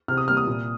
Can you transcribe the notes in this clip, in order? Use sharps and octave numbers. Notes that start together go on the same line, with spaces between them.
C3 F6
D#6
G3 A#3 F6
D#6
A#2